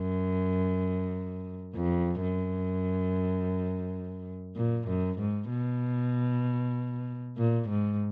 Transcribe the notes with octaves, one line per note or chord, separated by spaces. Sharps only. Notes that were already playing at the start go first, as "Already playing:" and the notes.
Already playing: F#2
F2
F#2
A#2
F#2
G#2
B2
A#2
G#2